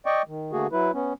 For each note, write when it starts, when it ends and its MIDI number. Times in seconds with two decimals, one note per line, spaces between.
0.06 0.22 74
0.06 0.22 75
0.06 0.22 79
0.06 0.22 85
0.28 0.52 51
0.53 0.67 50
0.53 0.67 57
0.53 0.67 58
0.53 0.67 66
0.53 0.67 68
0.72 0.91 54
0.72 0.91 64
0.72 0.91 71
0.94 1.13 59
0.94 1.13 61